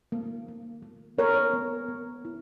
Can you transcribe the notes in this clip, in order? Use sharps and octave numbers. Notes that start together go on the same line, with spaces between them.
A#3
A#3
A#3
B3 A#4 C#5
B3
B3
E4